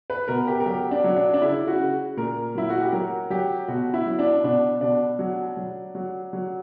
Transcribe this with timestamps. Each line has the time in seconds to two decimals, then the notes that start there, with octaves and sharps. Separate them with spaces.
0.10 B4
0.28 B2 A#4
0.47 G4
0.60 A#4
0.66 F#3 G4
0.91 D4
1.04 F#3
1.16 D4
1.34 D4
1.42 C#3 E4
1.67 F#4
1.79 C#3
2.17 A#2 A#4
2.55 F#3 E4
2.70 F#4
2.81 G4
2.92 F#3 A#4
3.30 F#3 G4
3.68 B2 F#4
3.94 E4
4.06 F#3
4.19 D4
4.44 B2 D4
4.81 B2 D4
5.19 F#3
5.57 F#3
5.95 F#3
6.33 F#3